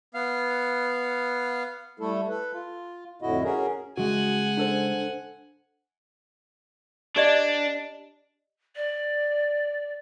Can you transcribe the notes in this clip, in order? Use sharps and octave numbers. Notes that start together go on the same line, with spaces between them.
B3 F5
G3 A3 E4 A4
A4 B4
F4
F2 A2 D3 E4 F#4 D#5
C#4 F#4 G#4 A#4
C#3 G#3 F#4 F#5 G#5
D4 A4 C5
D4 G4 D5 D#5
D5